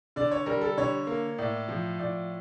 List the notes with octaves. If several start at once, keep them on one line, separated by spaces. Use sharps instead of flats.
D3 D5
C#5
G3 A#4
A4
D3 C#5
A#3
A2 D5
F3
A2 D5